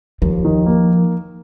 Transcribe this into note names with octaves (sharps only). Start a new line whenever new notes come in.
D#2 F3
D#3
A#3